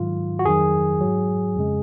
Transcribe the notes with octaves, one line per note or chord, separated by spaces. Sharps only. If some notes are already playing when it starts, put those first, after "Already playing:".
Already playing: G#2 D#3 F#3 F4
F#4
F2 D#3 F#3 G#4
G#2 F#3
F2 C#3 G#3